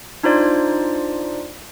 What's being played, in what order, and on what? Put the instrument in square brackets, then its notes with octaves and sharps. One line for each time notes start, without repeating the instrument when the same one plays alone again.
[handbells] D4 D#4 F4 C5 D5